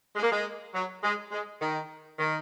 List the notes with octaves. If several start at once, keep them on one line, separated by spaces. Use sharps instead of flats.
G#3
A#3
G#3
F#3
G#3
G#3
D#3
D#3